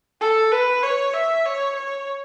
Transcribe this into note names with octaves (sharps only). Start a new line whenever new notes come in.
A4
B4
C#5
E5
C#5
C#5